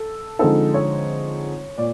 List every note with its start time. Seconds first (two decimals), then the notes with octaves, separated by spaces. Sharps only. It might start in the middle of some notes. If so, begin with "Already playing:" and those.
Already playing: A4
0.39 D3 F3 G#3 C4 D#4 A4
0.74 C#5
1.78 A#2 D5